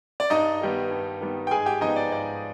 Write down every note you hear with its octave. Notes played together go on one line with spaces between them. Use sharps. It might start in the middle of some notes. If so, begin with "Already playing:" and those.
D5
G2 D#4 D#5
D#3 G3 B3
G2
D#3 G3 B3
G5
G#2 G#4 G#5
G4 G5
F3 B3 D#4 D#5
D5
G#2 D5